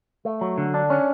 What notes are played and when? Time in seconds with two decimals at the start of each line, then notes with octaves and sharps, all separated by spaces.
0.25 A3
0.41 F#3
0.58 D3
0.74 D4
0.90 C#4